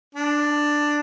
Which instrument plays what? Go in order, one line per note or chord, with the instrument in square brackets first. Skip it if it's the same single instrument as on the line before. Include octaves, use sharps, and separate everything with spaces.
[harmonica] D4